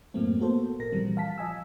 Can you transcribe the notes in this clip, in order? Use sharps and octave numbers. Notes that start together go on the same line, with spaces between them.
F#2 A2 F#3 A3 A#3 C4
A#3 B3 F#4 A4 C5
G#1 A#2 A#4 A#6
A#2 E3 F3 G3 C4
F5 A5 B6
F3 D#5 G#5 E6